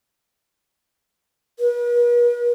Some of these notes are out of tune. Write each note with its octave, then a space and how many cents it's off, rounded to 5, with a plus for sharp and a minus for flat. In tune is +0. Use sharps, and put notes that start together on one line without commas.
B4 -45